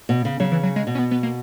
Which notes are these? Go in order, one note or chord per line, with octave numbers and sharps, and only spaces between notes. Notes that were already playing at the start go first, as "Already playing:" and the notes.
B2
C#3
C#3 F#3
E3
F#3
G#3
B2
C#4
B3
B3
A#3